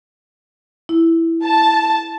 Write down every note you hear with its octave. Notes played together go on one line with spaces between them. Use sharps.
E4
A5